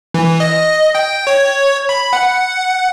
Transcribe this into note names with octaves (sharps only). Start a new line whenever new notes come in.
E3
D#5
G5
C#5
B5
F#5